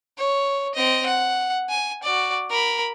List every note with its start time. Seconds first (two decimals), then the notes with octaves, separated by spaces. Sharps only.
0.18 C#5
0.75 C4 D#5
1.06 F#5
1.70 G#5
2.03 F#4 D5
2.50 A#4 B5